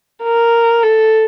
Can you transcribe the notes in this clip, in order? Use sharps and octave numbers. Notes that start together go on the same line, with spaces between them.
A#4
A4